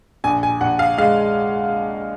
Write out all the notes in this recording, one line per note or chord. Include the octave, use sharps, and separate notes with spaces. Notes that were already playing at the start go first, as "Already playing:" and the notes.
A#1 G#5
G#5
A#1 F#5
F5
G#3 F5